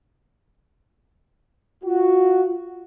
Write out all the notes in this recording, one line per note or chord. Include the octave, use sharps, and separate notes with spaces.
F4 F#4